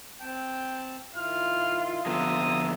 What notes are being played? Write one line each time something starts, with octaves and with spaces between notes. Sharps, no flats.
C4 G5 A5
D#3 E4 F4 F6
F2 D3 B3 E5 A5 A#5 D#6